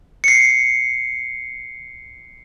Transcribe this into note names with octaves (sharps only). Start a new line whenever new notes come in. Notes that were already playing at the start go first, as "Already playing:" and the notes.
C7 C#7